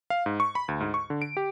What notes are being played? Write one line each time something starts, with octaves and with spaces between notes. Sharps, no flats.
F5
G#2
C#6
B5
D2
G#2
C#6
D3
D7
G4